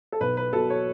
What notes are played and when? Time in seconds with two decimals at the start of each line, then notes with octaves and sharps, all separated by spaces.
0.12 A4
0.20 B1 B4
0.37 B4
0.53 B2 F#3 A4
0.70 C#5